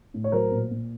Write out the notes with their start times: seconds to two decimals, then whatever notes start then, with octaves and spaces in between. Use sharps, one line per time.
0.14 A2
0.24 C#5
0.32 F#3 A#4 C5
0.52 A#2
0.71 A#2